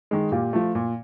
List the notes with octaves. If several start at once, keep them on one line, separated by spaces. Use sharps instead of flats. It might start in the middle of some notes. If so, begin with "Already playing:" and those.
D#3 G#3
A#2 F4 G4
F3 A3
A#2